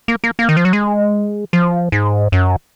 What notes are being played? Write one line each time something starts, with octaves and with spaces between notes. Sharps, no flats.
A#3
A#3
A#3
D#3
F3
F#3
G#3
F3
G#2
F#2